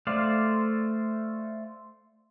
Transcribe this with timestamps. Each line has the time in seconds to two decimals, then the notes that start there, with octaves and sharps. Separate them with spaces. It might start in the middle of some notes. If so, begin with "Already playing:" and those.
0.07 A3 C5 D5 F5